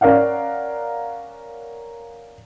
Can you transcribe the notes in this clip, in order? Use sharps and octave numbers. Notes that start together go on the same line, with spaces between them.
C#4 A#4 D5 F5 F#5